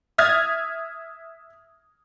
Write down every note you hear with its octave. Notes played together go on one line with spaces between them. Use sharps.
E5 D#6 F6 G#6 A6